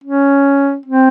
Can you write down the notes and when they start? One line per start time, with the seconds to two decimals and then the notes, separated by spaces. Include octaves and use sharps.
0.04 C#4
0.86 C4